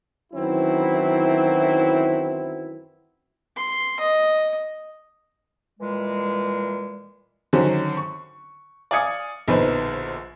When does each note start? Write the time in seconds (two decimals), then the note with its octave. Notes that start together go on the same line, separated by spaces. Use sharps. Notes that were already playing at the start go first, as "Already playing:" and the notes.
0.33 F#2 D#3 E3 F#3 C4 E4
3.56 C6
4.00 D#5
5.80 A#2 E3 G3 G#3
7.53 D3 D#3 F#3 C#4 F#4 C5
7.97 C#6
8.91 D5 F5 G#5 D#6 G#6 C#7
9.48 A#1 B2 D3 D#4 B4 C5